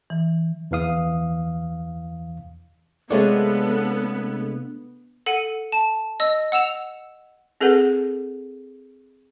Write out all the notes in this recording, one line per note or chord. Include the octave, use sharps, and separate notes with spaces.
E3
E2 E3 F5 D#6
C3 G#3 A3 B3 D4 F4 A4 C#5
A4 F#5 C#7 D#7
A5
D#5 E6
F#5 E6 E7 F7
C4 G#4 A4 B4 F#5